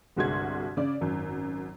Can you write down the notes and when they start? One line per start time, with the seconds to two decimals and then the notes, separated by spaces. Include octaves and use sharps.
0.17 G1 C2 G#3 F#4 C6 G#6
0.77 C#3 D5
1.01 G#1 F#2